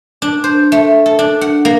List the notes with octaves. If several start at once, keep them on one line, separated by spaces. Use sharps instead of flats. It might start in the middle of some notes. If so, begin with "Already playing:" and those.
D4
C5
A3
A4
D4
F#5
A#3